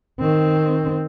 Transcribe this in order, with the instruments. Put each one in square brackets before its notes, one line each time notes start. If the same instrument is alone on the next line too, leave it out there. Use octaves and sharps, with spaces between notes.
[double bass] D#3 C4